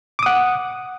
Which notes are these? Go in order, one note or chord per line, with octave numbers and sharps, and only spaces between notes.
F#5 D6 D#6